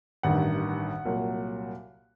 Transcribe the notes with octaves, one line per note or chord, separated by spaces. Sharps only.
A1 G2 D#3 F#5
C2 A#2 F#3